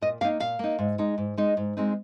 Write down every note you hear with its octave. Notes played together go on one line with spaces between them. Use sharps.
A#2 D#5
A#3 D#4 F5
A#2 F5
A#3 D#4
G#2
G#3 D#4
G#2
G#3 D#4
G#2
G#3 C4 D#4